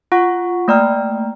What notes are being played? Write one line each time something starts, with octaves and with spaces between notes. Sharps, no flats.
F4 F#5 C#6
A3 A#3 D5 G5 A#5 F6